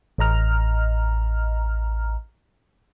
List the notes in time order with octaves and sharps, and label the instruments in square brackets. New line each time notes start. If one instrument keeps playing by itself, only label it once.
[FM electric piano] A1 D#5 A#5 F6